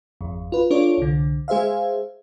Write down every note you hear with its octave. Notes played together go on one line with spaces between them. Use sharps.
G#1 F2
F4 B4
D4 F4 A4 C#5 D5
C2 D3
G#3 G#4 C5 E5 F5